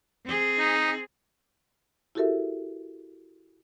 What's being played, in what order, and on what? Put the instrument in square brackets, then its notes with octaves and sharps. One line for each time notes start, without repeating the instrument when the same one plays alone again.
[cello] C4 G#4
[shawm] D#4
[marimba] E4 F#4 G4 A4 A#4 E5